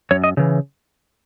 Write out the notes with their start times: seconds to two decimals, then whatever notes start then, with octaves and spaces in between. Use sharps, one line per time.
0.11 F#2 C#5
0.24 D#5
0.37 C#3 E3